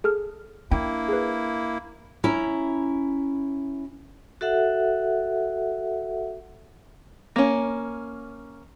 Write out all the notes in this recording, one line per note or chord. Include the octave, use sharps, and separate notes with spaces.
G#4 A4 F6
A#3 D4 E4 G5
G#4 B4
C#4 E4 A#5
F#4 A4 E5 F#5
A#3 C#4